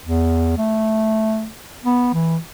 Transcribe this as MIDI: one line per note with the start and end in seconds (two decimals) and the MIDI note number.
0.06 0.55 40
0.58 1.47 57
1.84 2.09 59
2.14 2.37 52